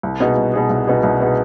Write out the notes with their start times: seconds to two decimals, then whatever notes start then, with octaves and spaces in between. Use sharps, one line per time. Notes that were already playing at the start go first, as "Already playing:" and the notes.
0.03 C2
0.20 B2 B3 D#4 G#4
0.37 C2
0.54 B2 B3 D#4 G#4
0.70 C2
0.87 B2 B3 D#4 G#4
1.03 C2
1.20 B2 B3 D#4 G#4